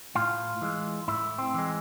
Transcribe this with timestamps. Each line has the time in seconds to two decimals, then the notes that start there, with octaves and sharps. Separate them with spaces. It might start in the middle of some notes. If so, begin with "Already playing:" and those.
0.15 A2 F4
0.62 E3 G#3
1.08 A2 E4
1.38 C4
1.54 E3 G#3